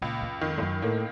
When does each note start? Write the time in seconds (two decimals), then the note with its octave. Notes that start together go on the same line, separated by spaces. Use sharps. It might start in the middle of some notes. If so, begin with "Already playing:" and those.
0.02 C#2 A#2
0.22 F#2
0.41 F2 D#3
0.58 A2
0.62 F#2
0.82 A2 A#3